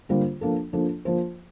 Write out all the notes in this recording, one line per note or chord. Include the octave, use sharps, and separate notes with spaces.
D3 G3 A#3 F4 C5
F3 A#3 D4 A4
F3 A#3 D4 A4
F3 A#3 F4 C5